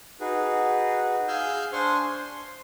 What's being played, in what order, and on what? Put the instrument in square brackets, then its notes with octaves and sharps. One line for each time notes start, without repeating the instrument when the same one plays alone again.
[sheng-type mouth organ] D#4 F#4 G#4 B4
G#4 F5 G#5 E6 F6 G6
D4 C5 G#5 C6 C#6
C6